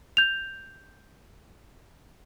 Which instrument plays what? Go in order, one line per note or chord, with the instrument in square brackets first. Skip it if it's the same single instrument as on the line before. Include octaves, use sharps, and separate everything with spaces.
[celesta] G6 F7